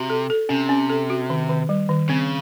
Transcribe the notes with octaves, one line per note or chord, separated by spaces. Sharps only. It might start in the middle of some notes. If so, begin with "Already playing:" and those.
Already playing: C3 F#4
A4
A4
C3 C#4
C#4
A4
F#4
D#3
D#3
G3
D#3
C#3 C4